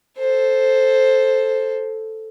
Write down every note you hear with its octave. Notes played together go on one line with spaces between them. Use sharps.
A4 C5